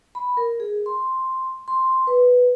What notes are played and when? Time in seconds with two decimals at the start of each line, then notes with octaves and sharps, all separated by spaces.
0.15 B5
0.37 A#4
0.60 G#4
0.86 C6
1.68 C6
2.07 B4